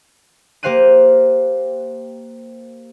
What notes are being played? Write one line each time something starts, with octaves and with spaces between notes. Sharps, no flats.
A#3 G4 C5 F5 F#6 D#7